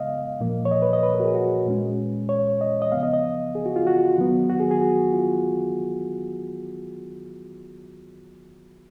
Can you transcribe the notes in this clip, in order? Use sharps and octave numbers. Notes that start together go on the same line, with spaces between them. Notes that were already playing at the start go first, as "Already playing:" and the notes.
Already playing: C#3 G#3 B3 D#5 F5
A#2 F3 A#3
C#5
D#5
B4
D#5
B4
A#4
F#4
G#4
F#4
A#2 G#3 C#4
C#5
D#5
D#5
C#3 F3 B3 F5
D#5
D#5
G#4
F#4
F4
F#4
D#3 F#3 B3
F#4
G#4
G#4
F#4
F4